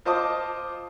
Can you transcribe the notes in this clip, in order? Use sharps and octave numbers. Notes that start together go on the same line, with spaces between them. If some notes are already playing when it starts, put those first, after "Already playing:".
F4 C5 D#5 A5 D6 D#6